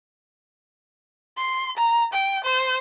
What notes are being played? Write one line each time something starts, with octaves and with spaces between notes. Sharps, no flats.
C6
A#5
G5
C5